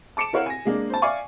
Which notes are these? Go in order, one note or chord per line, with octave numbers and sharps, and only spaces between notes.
A5 D6 C#7 D7 E7
E4 A#4 C#5 F5 F#5
G#5 A#6
G#3 A#3 D4
C5 A5
D5 E5 F5 G#5 C#6 D6